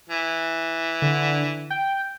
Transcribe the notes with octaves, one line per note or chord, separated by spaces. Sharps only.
E3
D3
G5